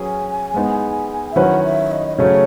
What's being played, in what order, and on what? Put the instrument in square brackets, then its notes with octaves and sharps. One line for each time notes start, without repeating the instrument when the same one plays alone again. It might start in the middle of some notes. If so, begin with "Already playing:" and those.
Already playing: [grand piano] F#3 C#4 G#4 B4 [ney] G#5
[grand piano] G#3 B3 D#4
[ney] E5
[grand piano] D#3 F#3 C#4 E4 B4 [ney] F#5
[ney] E5
D#5
D#5
[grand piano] C#3 F#3 A3 C#4 [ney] C#5